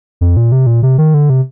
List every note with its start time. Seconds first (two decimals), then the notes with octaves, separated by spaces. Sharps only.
0.21 F2
0.37 A#2
0.52 C3
0.67 A#2
0.83 C3
0.98 D#3
1.14 D3
1.30 C3